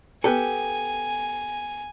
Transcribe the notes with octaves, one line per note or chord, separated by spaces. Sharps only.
B3 G4 A4 G#5